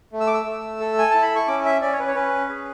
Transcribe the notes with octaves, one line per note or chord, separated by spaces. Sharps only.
A3
E6
D6
E6
A3
A4
G#5
E4 A5
B5
C#6
C#4 D6
E5
C#4 D5
C#5
B4
C#5
C#4 B4
G#4